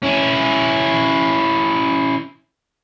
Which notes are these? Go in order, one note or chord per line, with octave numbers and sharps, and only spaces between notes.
C#4 E4